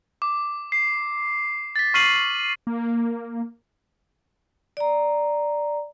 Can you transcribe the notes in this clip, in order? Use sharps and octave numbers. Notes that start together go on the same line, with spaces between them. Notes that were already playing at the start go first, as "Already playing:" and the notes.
D6
C7
A6 B6
C#6 F6 B6 C7 D#7 F#7
A#3
D5 A#5